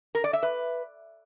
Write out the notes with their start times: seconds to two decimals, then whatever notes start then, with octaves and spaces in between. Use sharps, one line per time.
0.15 A#4
0.24 D5
0.33 E5
0.43 B4